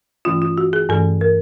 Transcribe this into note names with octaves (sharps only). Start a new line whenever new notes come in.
G2 E3 A3 C#4 F4
F4
F#4
G#4
G2 E3 A3 C#4 A4
A#4